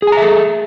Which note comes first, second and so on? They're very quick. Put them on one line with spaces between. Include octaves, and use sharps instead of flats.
G#4 G#5 A#5 E5 A4